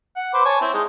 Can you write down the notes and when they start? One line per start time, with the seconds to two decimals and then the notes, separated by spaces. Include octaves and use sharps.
0.16 F#5
0.34 B4 C5 D6
0.45 C#5 G#5 A5
0.61 C4 E4
0.74 G#3 D#4